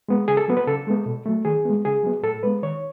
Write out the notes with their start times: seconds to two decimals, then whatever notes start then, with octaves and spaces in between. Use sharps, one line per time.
0.08 G#3 B3
0.28 C#3 G#4
0.37 A4
0.48 F#3 B3
0.57 B4
0.67 C#3 A4
0.87 G#3 B3
1.06 B2
1.26 F#3 A3
1.45 D#3 G#4
1.65 G#3 B3
1.85 C#3 G#4
2.03 F#3 B3
2.23 A2 A4
2.43 G#3 B3 B4
2.62 D#3 C#5